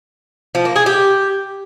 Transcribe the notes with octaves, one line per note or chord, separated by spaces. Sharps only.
F3
A#3
G#4
G4